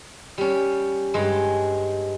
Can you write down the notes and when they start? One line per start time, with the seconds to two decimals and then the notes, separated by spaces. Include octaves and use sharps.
0.38 G3 C#4
1.14 G2 G#3